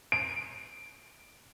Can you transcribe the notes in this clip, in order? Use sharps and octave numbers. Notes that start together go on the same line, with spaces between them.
D7